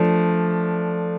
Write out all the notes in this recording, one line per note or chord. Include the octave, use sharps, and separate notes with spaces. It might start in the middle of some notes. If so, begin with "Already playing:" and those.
Already playing: F3 A3 D4